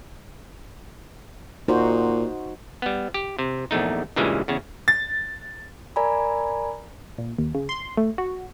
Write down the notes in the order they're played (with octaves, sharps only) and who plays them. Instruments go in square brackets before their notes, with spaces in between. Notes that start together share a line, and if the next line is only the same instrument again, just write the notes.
[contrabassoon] A#2 [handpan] D#4 F#4 C5
[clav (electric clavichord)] G3 B3
G4
C3
A#1 E2 A3 D#4
G2 A#2 C#3 E3 G3 G#3
E2 C#3
[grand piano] A6
[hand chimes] A#4 D5 G#5 A#5 B5
[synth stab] A#2
D#2
C#3
C6
A3
F#4